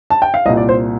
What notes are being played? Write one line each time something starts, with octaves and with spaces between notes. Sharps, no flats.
A5
G5
F5
C2 A#2 D#5
D5
C5